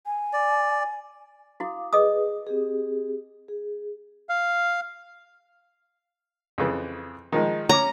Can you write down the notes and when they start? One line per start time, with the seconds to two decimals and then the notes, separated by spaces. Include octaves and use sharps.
0.06 G#5
0.33 D5
1.60 E4 F#4 F5 D6 D#6
1.93 G#4 B4 D#5 D6 D#6
2.47 C4 G4 G#4
3.48 G#4
4.29 F5
6.58 F2 C#3 E3
7.32 D#3 F3 G#3
7.69 C#4 A#5 D6